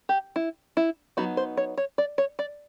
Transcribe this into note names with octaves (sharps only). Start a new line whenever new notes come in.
G4
E4
E4
F#3 B3 D#4 F#4
C5
C#5
C#5
D5
C#5
D5